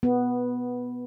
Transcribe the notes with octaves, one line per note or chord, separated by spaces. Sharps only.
B3